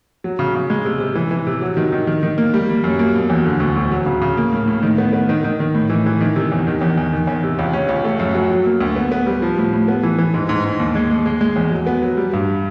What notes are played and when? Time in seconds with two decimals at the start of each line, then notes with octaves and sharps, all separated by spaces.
0.24 F#3
0.39 C#3
0.55 C#3
0.70 G#3
0.85 C3
1.00 C3
1.15 E3
1.31 E3
1.47 C3
1.62 F#3
1.77 D#3
1.93 D#3
2.07 D#3
2.23 D#3
2.38 A#3
2.54 G3
2.69 G3
2.84 F#2
2.99 A#3
3.15 B2
3.30 E2
3.45 D3
3.60 D2
3.76 D2
3.91 F#3
4.06 C#3
4.22 C#3
4.37 A#3
4.53 A2
4.68 A2
4.83 D#3
4.98 B3
5.13 B3
5.29 D#3
5.44 D#3
5.60 D#3
5.75 A2
5.90 E3
6.06 E3
6.21 D#3
6.36 C3
6.52 E2
6.67 D#3
6.81 E2
6.97 E2
7.13 D#3
7.27 E2
7.43 C3
7.59 C#2
7.73 C#4
7.89 C#2
8.04 A3
8.20 F#2
8.35 F#3
8.50 F#3
8.65 A#3
8.81 D2
8.96 B3
9.12 B3
9.26 G3
9.42 F3
9.58 A2
9.73 A2
9.88 B3
10.03 E3
10.18 E3
10.34 G#2
10.49 G#2
10.65 G#2
10.80 D#2
10.95 G#3
11.11 G#3
11.26 G#3
11.41 G#3
11.56 E2
11.71 F#3
11.87 B3
12.03 F#3
12.17 G3
12.33 G2